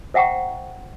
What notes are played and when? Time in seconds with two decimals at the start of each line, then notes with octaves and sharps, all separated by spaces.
0.14 C5 E5 F#5 G5 A#5 C#6